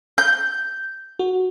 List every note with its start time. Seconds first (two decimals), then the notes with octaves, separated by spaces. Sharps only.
0.18 G6
1.19 F#4